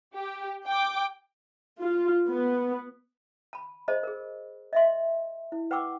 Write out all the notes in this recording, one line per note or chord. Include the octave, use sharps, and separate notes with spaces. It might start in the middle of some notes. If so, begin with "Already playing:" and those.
G4
G5 D6
F4
B3
A5 B5
G#4 C5 D#5 A5
G#4 A#4
D#5 E5 C6
E4
B4 F#5 G5 C#6 D6 E6